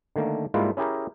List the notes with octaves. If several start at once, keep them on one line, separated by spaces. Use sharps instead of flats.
D3 D#3 A3 A#3
G#2 G3 G#3 A#3 E4 F4
C#4 E4 G4 G#4 A#4